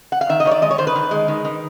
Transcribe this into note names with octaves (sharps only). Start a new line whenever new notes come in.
F#5
F5
D#3 E5
D#5
D#3 C#5
D5
G#3 D#5
C#5
D#3 C5
B4
D#3
G#3
D#3
D#3